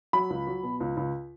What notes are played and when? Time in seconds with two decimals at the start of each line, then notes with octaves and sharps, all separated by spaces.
0.13 F#3 B5
0.30 C#2
0.47 F#3
0.64 B2
0.80 C#2
0.97 C#2